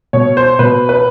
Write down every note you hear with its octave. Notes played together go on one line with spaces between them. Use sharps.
B2 C#5
C5
B2 B4
B4